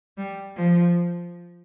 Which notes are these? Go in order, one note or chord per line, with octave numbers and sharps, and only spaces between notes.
G3
F3